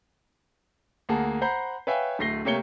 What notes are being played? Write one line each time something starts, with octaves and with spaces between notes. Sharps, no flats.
D2 A#3 G#4 F#5 A5
C5 F#5 A#5 B5 G6 C7
B4 C#5 E5 F5 G5 G#5
D1 A3 A#6 C7 G7
C3 A3 A#3 C#5 C#7 G7